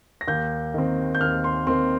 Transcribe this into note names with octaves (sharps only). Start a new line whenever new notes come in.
A#6
D#2 G6
D#3 C4
G6
D#2 F6
C6
D#3 C4 C6